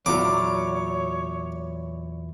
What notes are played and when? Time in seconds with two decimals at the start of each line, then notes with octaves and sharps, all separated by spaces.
0.06 E2 A#2 F#3 C#5 D6